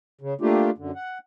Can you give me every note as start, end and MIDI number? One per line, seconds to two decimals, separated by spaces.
0.21 0.34 49
0.41 0.71 57
0.41 0.71 58
0.41 0.71 62
0.41 0.71 65
0.41 0.71 67
0.78 0.91 42
0.78 0.91 50
0.95 1.18 78